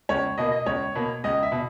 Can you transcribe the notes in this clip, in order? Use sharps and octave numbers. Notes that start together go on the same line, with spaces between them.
C#2 C#5
B2 A#3 D#5
D#5
C#2 C#5
B2 A#3
C#2 D#5
E5
B2